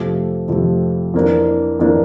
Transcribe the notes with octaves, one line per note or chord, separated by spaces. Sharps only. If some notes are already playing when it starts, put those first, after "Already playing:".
Already playing: F2 C3 F3 A3
F2 C3 F3 A3
F2 E3 A#3 D4
F2 E3 A#3 D4